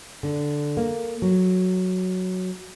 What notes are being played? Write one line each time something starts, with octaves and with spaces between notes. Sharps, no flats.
D3
A#3
F#3